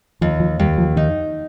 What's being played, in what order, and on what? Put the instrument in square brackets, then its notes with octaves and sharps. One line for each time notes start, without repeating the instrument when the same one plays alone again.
[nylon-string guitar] D#2 [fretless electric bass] F3
[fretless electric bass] F3
[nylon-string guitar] D#2 [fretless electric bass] G3
[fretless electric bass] F3
[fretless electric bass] D#3 [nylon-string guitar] D#4